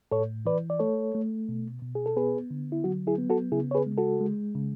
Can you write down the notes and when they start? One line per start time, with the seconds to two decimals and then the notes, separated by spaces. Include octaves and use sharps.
0.11 A2 A4 C#5
0.45 E3 B4 D5
0.70 D5
0.79 A3 A4 C#5
1.15 A3
1.49 B2
1.82 B2
1.95 G#4
2.06 A4
2.16 B3 G#4 B4
2.51 D3
2.72 E4
2.84 F#3 F#4
3.07 E4 G#4
3.18 B3
3.30 F#4 A4
3.52 C#3 E4 G#4
3.71 C#5
3.75 G#4 B4
3.86 G#3
3.98 F#4 A4
4.21 G#3
4.55 C#3